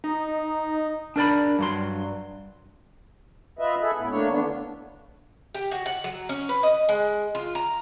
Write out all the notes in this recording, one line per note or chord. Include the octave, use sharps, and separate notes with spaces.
D#4
D4 A#4 D5 B5
G2 F#3 C6
F4 B4 D#5 E5
G#4 A4 B4 E5
D2 A2 B3 E4
A3 A#3 D4 C#5
D3 E3 A3 B3 D4
G4
F#4
F#5
F#3
C#4
B4
D#5
G#3
F4
A#5